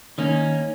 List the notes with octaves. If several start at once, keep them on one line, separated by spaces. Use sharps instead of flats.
D#3 A#3 C#4 D#4